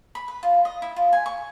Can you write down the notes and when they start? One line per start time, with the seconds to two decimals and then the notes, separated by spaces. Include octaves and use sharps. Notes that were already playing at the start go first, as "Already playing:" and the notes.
0.15 B5
0.28 B4
0.43 F4
0.65 D#5
0.82 E4
0.96 F4
1.13 G#5
1.26 C#6